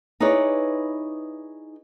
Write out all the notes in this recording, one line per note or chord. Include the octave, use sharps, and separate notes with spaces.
D#4 E4 G#4 B4 C#5 D5